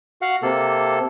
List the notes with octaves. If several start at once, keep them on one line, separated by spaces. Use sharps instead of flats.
F#4 F5 F#5
C3 A#3 A4